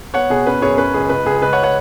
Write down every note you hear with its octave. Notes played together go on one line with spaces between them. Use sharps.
B3 C#5 F#5
B2 G#4
C#4 B4
F#2 G#4 C#5
C#4 B4
C#2 G#4
C#2 B4
C#2 G#4
C#2 B4
C#5 F#5
C#5 F#5